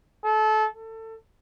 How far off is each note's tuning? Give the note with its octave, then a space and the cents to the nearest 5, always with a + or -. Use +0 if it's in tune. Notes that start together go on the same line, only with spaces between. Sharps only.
A4 -25
A4 +25